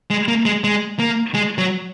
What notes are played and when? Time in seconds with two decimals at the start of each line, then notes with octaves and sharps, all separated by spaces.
0.10 G#3
0.28 A#3
0.45 G#3
0.64 G#3
0.99 A#3
1.34 G#3
1.58 F#3